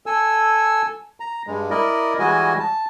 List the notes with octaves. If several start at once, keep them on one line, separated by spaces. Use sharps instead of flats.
A4 G#5 E6
A#5
G2 G#3
E4 A#4 D5 D#5
E3 G3 G#3 F#4 D#5 G#5
A5